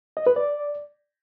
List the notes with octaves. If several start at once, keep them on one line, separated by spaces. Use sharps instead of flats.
D#5
B4
D5